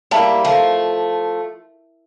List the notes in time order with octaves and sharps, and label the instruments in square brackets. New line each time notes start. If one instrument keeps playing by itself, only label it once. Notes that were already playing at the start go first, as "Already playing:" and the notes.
[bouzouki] G3 A#3 [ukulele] E4 A#4 E5 A5
[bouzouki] F3 A3